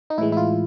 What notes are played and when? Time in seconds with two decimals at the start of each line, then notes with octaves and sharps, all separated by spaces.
0.10 D#4
0.18 A2 E3 G#3 E4
0.32 E4
0.37 F4